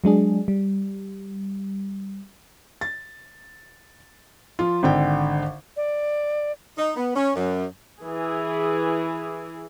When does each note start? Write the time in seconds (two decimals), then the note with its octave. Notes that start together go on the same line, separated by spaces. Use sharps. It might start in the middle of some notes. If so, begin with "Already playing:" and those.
0.04 F#3 G#3 D4 G#4
0.48 G3
2.81 A6
4.59 F3 F4
4.83 G#1 D3 G5
5.77 D5
6.78 D#4
6.97 B3
7.16 C#4
7.36 F#2
8.01 E3 G#4